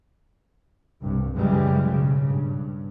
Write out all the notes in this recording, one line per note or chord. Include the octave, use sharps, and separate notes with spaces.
C2 G2
F#2 C#3 E3 G3 G#3
B1 G#2 C#3
G2